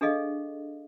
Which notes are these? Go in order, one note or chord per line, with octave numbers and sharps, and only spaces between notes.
D4 G#4 A4 D#5 F5